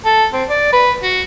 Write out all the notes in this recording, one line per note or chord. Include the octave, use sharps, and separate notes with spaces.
A4
C4
D5
B4
F#4